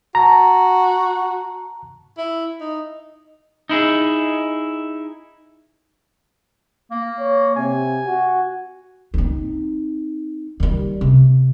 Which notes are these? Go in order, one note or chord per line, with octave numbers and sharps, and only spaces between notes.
F#4 A5 A#5
E4
D#4
D#4 E4 G#4
A#3
C#5
C3 G#5
F#4
C4 D#4
D#3 G3
C3